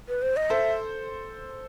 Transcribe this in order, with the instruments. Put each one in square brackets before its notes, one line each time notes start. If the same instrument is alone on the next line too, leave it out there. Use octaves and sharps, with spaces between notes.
[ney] B4
C5
D#5
[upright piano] A4 C5 [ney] E5